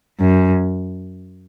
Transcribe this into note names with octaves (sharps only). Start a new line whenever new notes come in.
F#2